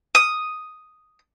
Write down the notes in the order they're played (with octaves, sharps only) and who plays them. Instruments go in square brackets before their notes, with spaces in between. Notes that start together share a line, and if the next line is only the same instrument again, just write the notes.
[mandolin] D#6